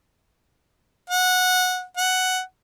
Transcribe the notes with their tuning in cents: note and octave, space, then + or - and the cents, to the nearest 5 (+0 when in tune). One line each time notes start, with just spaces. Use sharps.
F#5 -15
F#5 +5